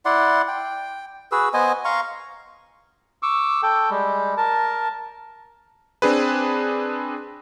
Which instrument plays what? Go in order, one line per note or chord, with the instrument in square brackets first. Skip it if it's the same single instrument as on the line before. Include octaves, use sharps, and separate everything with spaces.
[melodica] E4 D5 F#5 C6
G5
F#4 G#4 B4 E6
B3 C5 D#5 G#5
F5 A#5 C6 C#6
C#6 D6 E6
A4 G5
G3 G#3
A#4 A5
[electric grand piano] C4 D4 G#4 B4